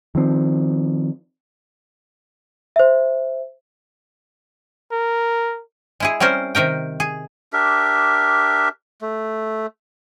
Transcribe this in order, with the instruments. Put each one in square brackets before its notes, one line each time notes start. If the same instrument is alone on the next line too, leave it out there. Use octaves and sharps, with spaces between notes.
[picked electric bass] D#3 F3 C4
[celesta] C5 E5
[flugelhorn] A#4
[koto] G#3 E4 G#4
G3 C4 C#4 A#4 C5
C3 D#3 A#4 G5
G#4
[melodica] D4 G4 A#4 E5
A3